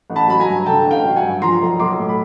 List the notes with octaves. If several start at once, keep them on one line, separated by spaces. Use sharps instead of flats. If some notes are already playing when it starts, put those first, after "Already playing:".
A1
A5 B5
F#3 B5
G#5 A#5
G2
D3 G5 A5
A1
F5 G5
F#3
F#5 G#5
G2
F3 A#5 C6
B1
B1 C6 D6
A2
B5